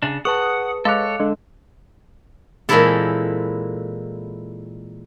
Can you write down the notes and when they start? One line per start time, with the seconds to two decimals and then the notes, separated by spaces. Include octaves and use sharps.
0.03 C#3 D4
0.25 G#4 B4 F#5 A5 C#6 D#6
0.85 G#3 A4 C#5 F5 D6 F#6
1.20 G#3 D4 A4
2.69 A#2 E3 G#3 C4 E4 A4